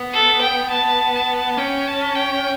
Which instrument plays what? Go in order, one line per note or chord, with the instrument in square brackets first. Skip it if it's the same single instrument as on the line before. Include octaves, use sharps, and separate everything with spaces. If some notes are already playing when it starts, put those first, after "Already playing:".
Already playing: [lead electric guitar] B3
[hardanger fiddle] A4
G5
A5
A5
[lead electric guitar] C#4 [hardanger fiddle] G5
[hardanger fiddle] A5
G5